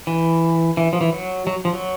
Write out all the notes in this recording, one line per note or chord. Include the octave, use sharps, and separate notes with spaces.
E3
E3
F3
E3
F#3
F#3
F3
F#3